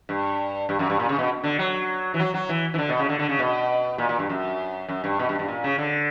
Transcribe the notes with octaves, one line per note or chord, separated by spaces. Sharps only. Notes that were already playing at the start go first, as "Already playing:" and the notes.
G2
G2
F#2
G2
A#2
C#3
B2
D3
F#3
E3
F#3
F#3
E3
E3
D3
B2
C#3
D3
D3
C#3
B2
A#2
A#2
G2
F#2
F#2
G2
B2
G2
G2
A#2
C#3
D3